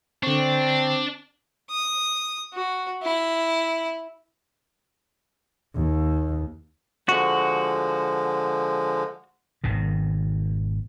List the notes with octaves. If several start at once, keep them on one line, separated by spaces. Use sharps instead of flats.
D3 C4 D4 C#6
D#6
F#4
E4
D#2
D3 F3 G#3 F#4
G#1 B2 D#3